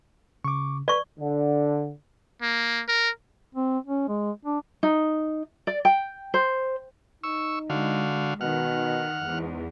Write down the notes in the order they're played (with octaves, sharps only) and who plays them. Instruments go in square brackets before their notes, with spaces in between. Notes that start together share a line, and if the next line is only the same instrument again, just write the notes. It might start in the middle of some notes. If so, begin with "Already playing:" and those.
[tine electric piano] C#3 [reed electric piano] C#6 D6
[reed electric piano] B4 [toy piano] D5 C#6
[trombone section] D3
[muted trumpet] A#3
A#4
[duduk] C4
C#4
G#3
D4
[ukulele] D#4
D5
G5
C5
[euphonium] D#4 [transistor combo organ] C#6 E6
[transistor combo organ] D3 F#4 F5 [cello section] G#3
[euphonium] B2 [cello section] D#3 [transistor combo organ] F#5 F6
[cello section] E2 [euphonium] G#2